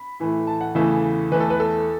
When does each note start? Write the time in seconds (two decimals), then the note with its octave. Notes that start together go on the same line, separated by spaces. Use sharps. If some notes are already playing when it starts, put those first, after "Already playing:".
Already playing: B5
0.20 A2 E3 A3
0.47 A5
0.61 F#5
0.75 E2 C#3 E3 A3 E5
1.32 E2 E3 A3 B4
1.40 A4
1.50 B4
1.60 A4